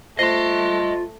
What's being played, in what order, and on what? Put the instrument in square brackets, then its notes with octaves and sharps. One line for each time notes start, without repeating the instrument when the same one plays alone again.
[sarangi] A3 [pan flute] F4 [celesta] C5 A#6 C7 [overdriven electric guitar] D#5 C6